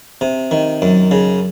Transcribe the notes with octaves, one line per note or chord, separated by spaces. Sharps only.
C3
D#3
F#2
C#3